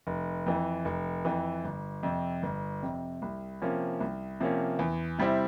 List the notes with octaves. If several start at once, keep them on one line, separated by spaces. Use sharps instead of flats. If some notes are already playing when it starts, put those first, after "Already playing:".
F1
F2 E3
F1
F2 E3
G1
F2 C3
G1
F2 C3
C2
C3 F3 A#3 C#4
C2
C3 F3 A#3 C#4
E2
C3 G3 C4 E4